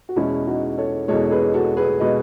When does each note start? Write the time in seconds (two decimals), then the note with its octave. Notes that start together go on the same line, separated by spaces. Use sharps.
0.09 F#4
0.16 E2 B2 G#3 C#4 E4
0.46 D#4 F#4
0.77 A4 C#5
1.08 E2 B2 G#3 A4 C#5
1.31 G#4 B4
1.54 F#4 A4
1.77 G#4 B4
2.00 B2 G#3 B4 D#5